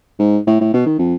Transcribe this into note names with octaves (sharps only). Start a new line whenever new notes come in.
G#2
A2
A2
B2
D#3
F2